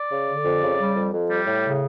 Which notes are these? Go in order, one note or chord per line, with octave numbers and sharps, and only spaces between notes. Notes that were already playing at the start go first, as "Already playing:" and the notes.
Already playing: D5
C#3
D3
F2
C#3
G3
F2
F2
G3
A2
C#3